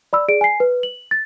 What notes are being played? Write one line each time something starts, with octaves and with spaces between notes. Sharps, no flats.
D5 B5 E6
G#4 D5 D7
G#5 C7
B4
F#7
A6